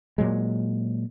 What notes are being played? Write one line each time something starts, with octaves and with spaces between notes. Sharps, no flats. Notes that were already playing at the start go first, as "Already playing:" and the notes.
A#2 F#3 G#3